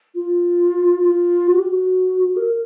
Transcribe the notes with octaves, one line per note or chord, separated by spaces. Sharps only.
F4
F4
F#4
G4
F#4
A#4